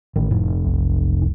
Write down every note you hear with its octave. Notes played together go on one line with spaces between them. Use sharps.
A1 D#3
F1 A2
B1
C2